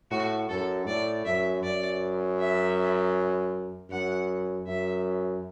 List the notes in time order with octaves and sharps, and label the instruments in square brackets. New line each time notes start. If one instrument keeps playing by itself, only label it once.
[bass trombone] A2 [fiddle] F#4
[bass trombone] F#2 [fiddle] A4
[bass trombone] A2 [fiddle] D5
[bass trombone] F#2 [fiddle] E5
[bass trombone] F#2 [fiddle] D5
[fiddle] E5
[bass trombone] F#2 [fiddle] F#5
[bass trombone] F#2 [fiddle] E5